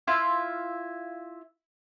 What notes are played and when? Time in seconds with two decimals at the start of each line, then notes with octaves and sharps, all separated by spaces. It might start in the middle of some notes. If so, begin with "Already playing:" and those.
0.07 E4 F4 E5 F5